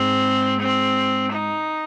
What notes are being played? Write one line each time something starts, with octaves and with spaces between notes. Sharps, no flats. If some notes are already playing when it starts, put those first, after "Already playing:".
Already playing: G#2 G#3 C4
C4
D#4